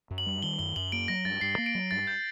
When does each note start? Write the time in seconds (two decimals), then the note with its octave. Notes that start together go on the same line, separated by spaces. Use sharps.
0.11 F#2
0.18 F#7
0.26 G3
0.42 D#3 G7
0.59 F#2 G7
0.76 F#2 F#7
0.92 A#3 D7
1.08 F#3 A#6
1.25 G2 A6
1.41 G2 C7
1.58 A#3
1.66 D7
1.75 F#3
1.91 G2 A6
2.07 G6